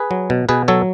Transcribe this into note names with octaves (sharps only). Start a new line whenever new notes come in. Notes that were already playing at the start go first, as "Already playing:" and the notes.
Already playing: G#4 B4
F#3
B2
B2 G#4 B4
F#3 A4 C#5